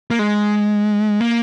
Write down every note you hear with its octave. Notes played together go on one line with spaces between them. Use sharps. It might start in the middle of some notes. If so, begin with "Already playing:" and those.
A#3
G#3
A#3